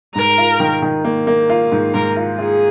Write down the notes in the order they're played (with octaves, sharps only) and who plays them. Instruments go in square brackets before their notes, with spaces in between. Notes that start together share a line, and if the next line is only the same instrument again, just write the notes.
[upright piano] G#2 [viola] A#4
[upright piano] F4
D#3
D#3
A#3
A#3
F4
G#2
[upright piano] G#2 [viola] A#4
[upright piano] F4
[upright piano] F4 [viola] G#4